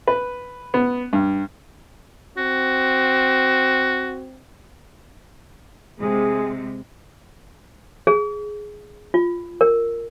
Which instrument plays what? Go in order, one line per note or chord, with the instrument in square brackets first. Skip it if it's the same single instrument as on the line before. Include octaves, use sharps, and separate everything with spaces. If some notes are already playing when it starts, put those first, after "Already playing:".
[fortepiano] B4
B3
G2
[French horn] C4 [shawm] F#4
[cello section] C3 G#3 C4 [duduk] G#4
[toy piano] G#4
F4
A#4